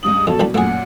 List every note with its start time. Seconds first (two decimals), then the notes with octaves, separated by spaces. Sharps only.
0.03 C#2 G2 D#6 F#7
0.27 F2 B2 F#3 A4
0.40 A#1 G3 B5
0.54 F#2 A#2 A3 G#4 F#5